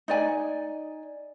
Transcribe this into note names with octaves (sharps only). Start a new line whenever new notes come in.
D#4 D5 G#5